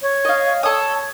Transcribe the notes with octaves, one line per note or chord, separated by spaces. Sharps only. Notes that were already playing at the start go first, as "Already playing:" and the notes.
C#5
D#5 F5
A4 C#5 D#6